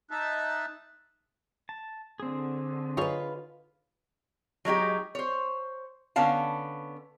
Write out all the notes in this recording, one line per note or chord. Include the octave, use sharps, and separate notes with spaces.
D#4 E5 A5 F#6
A5
D3 C4 G#4
D#4 F4 G#4 B4 C#5
F#3 G#3 D#4 G4
C5 C#5
D3 B3 C#4 F5 A5